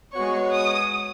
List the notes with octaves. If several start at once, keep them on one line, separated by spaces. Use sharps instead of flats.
G#3 B3 F#4 C#5 C#6
D#6